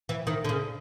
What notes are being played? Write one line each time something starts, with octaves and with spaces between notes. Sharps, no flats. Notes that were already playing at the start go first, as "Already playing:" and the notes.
E3
D#3
D3
C#3